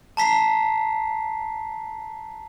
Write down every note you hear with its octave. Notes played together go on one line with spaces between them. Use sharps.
A5 A#5 B6 C7